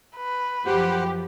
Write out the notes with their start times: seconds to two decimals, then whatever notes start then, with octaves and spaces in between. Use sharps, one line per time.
0.16 B4
0.66 F#2 F3 G4 C5 F#5